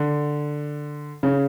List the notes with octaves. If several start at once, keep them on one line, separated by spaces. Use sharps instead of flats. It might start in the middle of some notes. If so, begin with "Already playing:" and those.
Already playing: D3
C#3